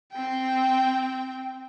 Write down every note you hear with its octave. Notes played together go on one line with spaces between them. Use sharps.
C4 G5